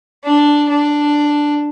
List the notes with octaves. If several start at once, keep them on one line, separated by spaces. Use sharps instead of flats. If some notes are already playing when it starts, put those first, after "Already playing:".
D4
D4